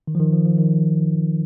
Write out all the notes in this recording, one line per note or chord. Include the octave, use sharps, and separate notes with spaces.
D#3
F3
D#3
F3
F3
D#3